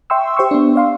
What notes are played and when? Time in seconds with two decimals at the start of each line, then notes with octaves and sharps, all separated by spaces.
0.10 E5 G5 C6 C#6 E6
0.37 G4 C5 G5 C6 C#6 E6
0.51 B3 D4
0.76 D5 F5 C6